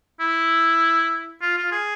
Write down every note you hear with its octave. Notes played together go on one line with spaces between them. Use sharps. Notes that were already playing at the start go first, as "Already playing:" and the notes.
E4
F4
F4
G#4